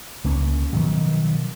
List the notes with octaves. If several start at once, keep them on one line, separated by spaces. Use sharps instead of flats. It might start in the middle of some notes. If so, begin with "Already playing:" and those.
C#2 A#3 C#4
B2 D#3 F3 F#3